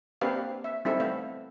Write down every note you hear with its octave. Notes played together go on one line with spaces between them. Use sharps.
A#3 C4 D4 G4 B4 F5
E5
G3 C4 D#4 E4 A4 E5
A3 B3 E5 F5